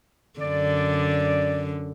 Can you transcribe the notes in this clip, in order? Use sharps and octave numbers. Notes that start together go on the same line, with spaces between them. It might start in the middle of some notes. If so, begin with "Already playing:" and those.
F#2 D3 D5